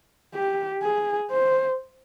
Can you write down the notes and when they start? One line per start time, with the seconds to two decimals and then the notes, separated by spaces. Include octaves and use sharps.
0.34 G4
0.83 G#4
1.31 C5